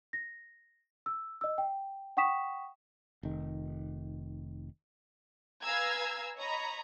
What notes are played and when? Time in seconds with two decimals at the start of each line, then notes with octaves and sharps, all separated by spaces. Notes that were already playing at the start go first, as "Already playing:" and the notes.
0.13 A#6
1.06 E6
1.41 D#5 E6
1.58 G5
2.17 F#5 G5 C#6 D#6 B6 E7
3.23 F1 D#3
5.62 B4 F5 G#5 A#5 E6 G#6
6.36 C#5 D#5 A#5 B5